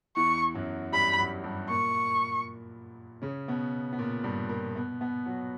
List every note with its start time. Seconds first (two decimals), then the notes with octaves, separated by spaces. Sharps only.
0.16 E2 E3 C#6
0.54 F#2 F#3
0.92 G2 G3 B5
1.18 F#2 F#3
1.44 G2 G3
1.69 A#2 A#3 C#6
3.22 C#3 C#4
3.48 B2 B3
3.93 B3
3.98 A#2 A#3
4.24 G2 G3
4.49 A#2 A#3
4.76 B2 B3
5.01 B2 B3
5.26 F#3 F#4